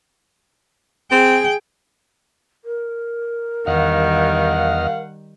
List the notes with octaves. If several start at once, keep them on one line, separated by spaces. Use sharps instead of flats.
C4 G#4 G5
A#4
E2 D#3 G3 D#5 F5 F#5 F6